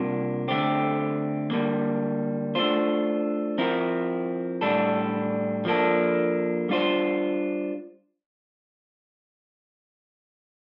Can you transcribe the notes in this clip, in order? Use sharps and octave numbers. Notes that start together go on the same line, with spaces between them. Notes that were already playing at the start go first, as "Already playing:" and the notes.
Already playing: C3 G3 A#3 D4 F4
D3 A3 C4 G4
D3 G3 A#3
A3 D4 F4 C5
F3 C4 E4 A#4
A2 G3 D4 A4
F3 A#3 D4 A4
G3 D4 F4 C5